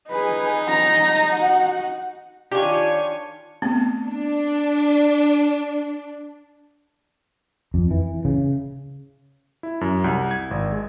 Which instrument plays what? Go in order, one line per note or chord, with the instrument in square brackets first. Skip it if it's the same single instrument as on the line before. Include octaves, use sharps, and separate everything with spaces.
[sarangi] D#4 [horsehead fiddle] G#4 B4
[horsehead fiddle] A#5
F#4 F#5
[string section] D#3 F4 C#5 [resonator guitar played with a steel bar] D4 [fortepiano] G4 [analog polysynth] G#5 C#6
[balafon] A3 B3 C4
[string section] D4
[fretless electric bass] F2
E3
C#3
[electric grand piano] E4
F#2
C2
G#6
G#1
G#3